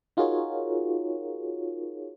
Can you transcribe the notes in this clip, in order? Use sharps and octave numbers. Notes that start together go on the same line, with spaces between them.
D#4 F4 F#4 G#4 A#4 C#5